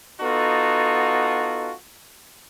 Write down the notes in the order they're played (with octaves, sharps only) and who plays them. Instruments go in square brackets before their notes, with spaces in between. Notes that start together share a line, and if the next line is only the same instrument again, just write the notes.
[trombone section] B3 D#4 F4 F#4 A4